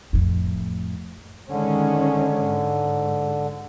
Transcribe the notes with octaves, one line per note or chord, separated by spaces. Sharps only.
F2 A2
D3 D#3 G#3 C#4
G#2